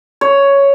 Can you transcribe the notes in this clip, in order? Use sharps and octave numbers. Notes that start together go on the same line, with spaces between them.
C#5